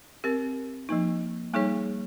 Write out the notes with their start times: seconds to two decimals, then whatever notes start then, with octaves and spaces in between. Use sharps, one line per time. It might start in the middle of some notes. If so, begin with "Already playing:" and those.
0.24 C4 G4 A#4
0.89 F3 A#3 D#4
1.54 G3 A#3 D#4 G#4 C#5